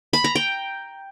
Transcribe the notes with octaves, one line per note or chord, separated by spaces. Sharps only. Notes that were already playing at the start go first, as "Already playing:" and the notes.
B5
A#5
G5